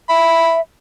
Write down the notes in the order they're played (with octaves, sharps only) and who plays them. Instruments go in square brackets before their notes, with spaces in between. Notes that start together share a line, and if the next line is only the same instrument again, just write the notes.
[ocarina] E5 [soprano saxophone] B5